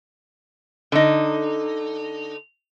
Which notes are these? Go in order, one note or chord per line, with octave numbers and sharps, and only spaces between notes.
D3 D#4